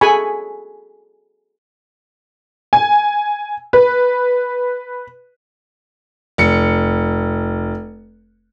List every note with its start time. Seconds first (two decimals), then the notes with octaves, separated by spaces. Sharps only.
0.01 F#4 G#4 A4 G#5 B5 C#6
2.73 G#5
3.73 B4
6.38 F1 C#7